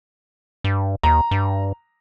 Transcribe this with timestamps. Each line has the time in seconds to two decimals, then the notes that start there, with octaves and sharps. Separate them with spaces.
0.64 G2
1.03 D#2 A#5
1.31 G2